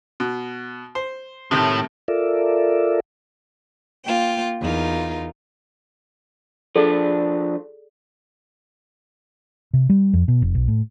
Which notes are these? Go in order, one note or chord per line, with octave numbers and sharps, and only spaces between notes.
B2
C5
A2 C3 D#3 A3
F4 A4 A#4 D5 E5
A#3 F4 G5
E2 D#4 F4 A#4
F3 D4 G#4 A4 D5
C3
G3
F2
B2
F1
B1
A2